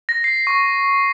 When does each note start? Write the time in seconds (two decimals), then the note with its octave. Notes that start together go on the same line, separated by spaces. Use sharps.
0.09 A#6
0.24 C7
0.47 C#6